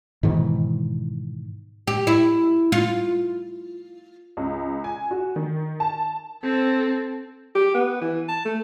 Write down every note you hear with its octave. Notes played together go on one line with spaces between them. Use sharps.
G#2 B2 D#3 E3
G4
E4
F4
C#2
G#5
F#4
D#3
A5
C4 A4
G4
B3
E3
A5
A3